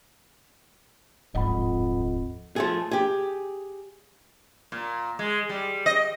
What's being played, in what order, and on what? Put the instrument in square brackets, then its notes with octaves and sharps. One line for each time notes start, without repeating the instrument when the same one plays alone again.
[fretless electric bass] D1 G1 G#2 [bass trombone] F2 [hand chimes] D#5 F#5 B5
[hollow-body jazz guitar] F3 A3 G#4
G4 G#4
[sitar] A#2
G#3
G3
D#5